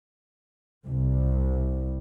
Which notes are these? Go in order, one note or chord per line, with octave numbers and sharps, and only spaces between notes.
C2